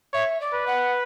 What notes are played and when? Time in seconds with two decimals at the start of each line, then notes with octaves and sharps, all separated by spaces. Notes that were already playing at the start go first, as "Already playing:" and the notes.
0.13 C#5 E5
0.40 D5
0.54 B4
0.67 F#5